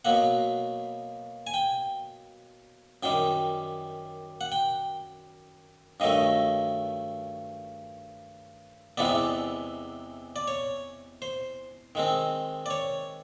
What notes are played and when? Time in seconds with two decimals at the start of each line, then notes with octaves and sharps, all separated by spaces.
0.05 B2 F#3 A#3 F#5
1.47 G#5
1.54 G5
3.03 F#2 D#3 G3 G5
4.41 F#5
4.52 G5
6.00 G2 D#3 F#3 A3 D#5
8.98 E2 C3 E3 G#3 B3 D5
10.36 D5
10.48 C#5
11.22 C5
11.95 D#3 G#3 C4
12.66 D5
12.70 C#5